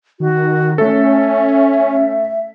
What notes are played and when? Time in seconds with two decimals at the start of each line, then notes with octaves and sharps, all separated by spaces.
0.20 D#3 F#4
0.78 A3 C#4 A4 E5